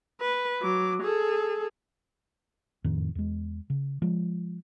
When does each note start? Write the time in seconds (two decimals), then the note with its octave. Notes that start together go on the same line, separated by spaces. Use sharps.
0.21 B4
0.62 F#3 D6
1.03 G#4 A4
2.84 F#1 F2 A2 D#3
3.15 E2 G#3
3.70 C#3
4.02 F3 G#3